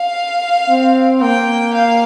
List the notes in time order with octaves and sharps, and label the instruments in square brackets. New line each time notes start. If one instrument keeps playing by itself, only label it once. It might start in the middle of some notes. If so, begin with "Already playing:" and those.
Already playing: [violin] F5
[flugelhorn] C4
[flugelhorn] A#3 [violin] G5
[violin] F5